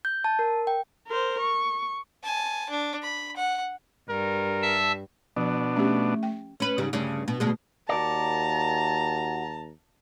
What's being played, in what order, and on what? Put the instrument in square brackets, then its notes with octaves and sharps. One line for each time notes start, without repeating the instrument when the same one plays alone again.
[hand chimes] G6
A5
A#4
G5
[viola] A#4 C5
C#6
[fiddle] G#5 A5
D4
B5
F#5
[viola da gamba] G2 [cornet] A#4
[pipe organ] E5 A5 E6
[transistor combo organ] B2 D4 [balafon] F3
[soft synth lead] A3 [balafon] C#4 G4
[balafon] G5
[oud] C#4 B4
G#2 C#3 G3
D2 G2 C#3
B2
D2 B2 G#3
[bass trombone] D#2 [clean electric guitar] F#4 A#4 D5 [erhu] A5 [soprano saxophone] A#5